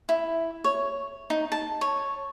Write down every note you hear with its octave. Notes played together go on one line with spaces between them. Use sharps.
E4
C#5
D#4
A5
C#5